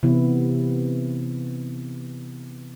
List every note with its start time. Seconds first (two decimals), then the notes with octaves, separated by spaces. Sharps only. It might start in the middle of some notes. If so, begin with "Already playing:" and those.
0.03 C3 E3 B3 E4